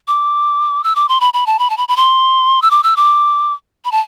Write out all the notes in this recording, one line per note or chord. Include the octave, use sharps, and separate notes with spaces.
D6
E6
D6
C6
B5
B5
A5
B5
A5
B5
B5
C6
E6
D6
E6
D6
B5
A5